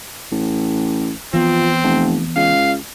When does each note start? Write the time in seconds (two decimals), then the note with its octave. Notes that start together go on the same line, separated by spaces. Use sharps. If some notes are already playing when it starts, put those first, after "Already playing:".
0.31 A1
1.33 E3 F3 B3 C4
1.83 F1
2.36 C#2 F5